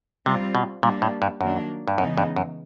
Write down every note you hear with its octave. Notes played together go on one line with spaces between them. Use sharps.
C3 G3 C4 F4
B2
A#2 G3 A#3 D4
A2
G2
F#2 D#3 F#3 A#3 D4
G2
F#2 C#3 E3 G#3 B3 D#4
G2
F#2